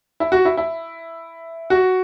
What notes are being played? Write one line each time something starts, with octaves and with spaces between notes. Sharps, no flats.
E4
F#4
E4
E4
F#4